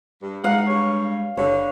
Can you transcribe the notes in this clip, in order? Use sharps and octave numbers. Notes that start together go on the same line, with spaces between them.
G2
E2 G#3 D#4 F5 F#5
G2 C#5
F#1 D3 G3 C#5